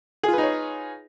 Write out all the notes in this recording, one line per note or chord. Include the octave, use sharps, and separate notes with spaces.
D#4 F4 G#4 B4 C#5